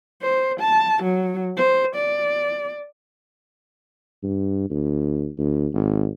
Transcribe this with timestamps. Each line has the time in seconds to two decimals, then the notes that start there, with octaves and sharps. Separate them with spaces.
0.22 C5
0.60 A5
1.03 F#3
1.57 C5
1.95 D5
4.23 G2
4.70 D2
5.38 D2
5.74 G#1